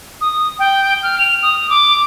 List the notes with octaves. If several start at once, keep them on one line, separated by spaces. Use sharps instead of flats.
D#6
G5
F6
F7
D#6
D6